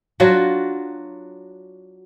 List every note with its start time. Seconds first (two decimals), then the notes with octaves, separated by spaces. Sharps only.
0.20 F#3 D4 F4 F#4